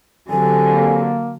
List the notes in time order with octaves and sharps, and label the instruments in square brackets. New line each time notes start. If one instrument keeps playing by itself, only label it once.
[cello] D3 F#3 [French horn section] C4 G4 A4 [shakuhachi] G#5
[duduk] A#3